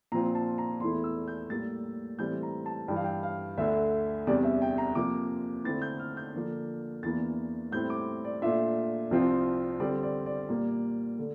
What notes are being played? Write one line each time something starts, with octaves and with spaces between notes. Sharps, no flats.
A#2 F3 C4 F4 A#5
A5
A#5
E2 E3 A3 E4 C6
E6
G6
A2 G3 A#3 A6
A2 E3 G3 C4 G6
A#5
A5
G2 E3 G3 G5
F5
G5
F5
D2 D3 A3 E5
E2 C3 G3 D4 D5
E5
G5
A#5
C3 F3 A#3 D6
D3 A3 C4 E4 A6
G6
F6
G6
D3 F3 A#3 D4
E2 E3 A#3 D4 A6
A2 G3 C4 E4 G6
D6
D5
A#2 A3 D4 F4 E5
C2 C3 F3 C4 F4
D3 G3 C4 D5
D5
D5
A#2 G3 A#3
D3 A3